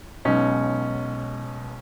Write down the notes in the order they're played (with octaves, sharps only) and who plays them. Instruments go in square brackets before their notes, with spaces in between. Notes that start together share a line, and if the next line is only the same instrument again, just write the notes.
[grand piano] B1 B2 G#3 C#4 D#4